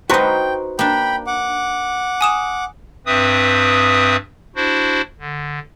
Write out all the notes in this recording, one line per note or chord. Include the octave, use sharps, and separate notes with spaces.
D#4 F#4 B4 C5 G5 A#5 C#6
A#3 D4 G5 B5
F#5 D6
G#5 D#6 E7
G2 C4 B4 E5 D#6
D4 E4 F#4 C5
D3